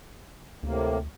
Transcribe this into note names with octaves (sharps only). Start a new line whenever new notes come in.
D2 A2 C3 A#3